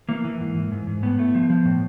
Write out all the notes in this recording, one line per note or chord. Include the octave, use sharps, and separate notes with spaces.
E3 A#3
E3
G#2
E3
G#2
G#2
A2 B3
A3
F3
F3
A2